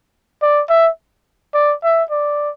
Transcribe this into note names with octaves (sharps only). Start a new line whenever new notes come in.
D5
E5
D5
E5
D5